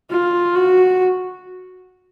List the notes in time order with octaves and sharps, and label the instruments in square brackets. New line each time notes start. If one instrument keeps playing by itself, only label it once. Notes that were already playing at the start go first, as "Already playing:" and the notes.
[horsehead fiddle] F4
F#4